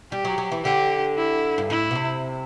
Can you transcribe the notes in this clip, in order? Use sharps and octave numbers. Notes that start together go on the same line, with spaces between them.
G3 G4
F#3
F#3
E3
D3 G4
E4
G2
A2 E4
B2
C3